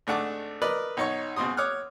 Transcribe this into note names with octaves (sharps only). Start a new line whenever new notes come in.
G#1 A3 D4 F#5 A5 D6
A#4 B4 D5 D#5
B1 D#4 C#5 C#6
C#2 B2 C4 C6 D#6
C#5 D6 D#6 F6 F#6